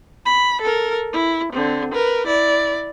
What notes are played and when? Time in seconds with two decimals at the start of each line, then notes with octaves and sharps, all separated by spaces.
0.26 B5
0.61 A4 A#4
1.13 E4
1.52 D3 C4
1.93 A#4 B4
2.26 E4 D5